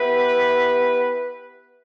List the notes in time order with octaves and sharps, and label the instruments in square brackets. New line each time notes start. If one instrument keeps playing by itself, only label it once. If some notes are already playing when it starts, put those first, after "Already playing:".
Already playing: [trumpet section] B3 E4 G4 B4